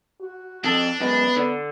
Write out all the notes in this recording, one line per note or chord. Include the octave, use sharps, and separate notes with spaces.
F#4
F2 D4 A4
F#2 G#3 B3
D3